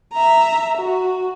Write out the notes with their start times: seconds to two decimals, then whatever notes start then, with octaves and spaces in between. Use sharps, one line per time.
0.13 E5 A#5
0.77 F#4